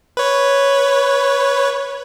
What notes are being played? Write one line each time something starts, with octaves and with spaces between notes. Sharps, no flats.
B4 C#5